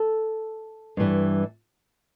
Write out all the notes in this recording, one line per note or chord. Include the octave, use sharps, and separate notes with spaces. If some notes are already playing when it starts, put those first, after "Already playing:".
Already playing: A4
G2 E3 G3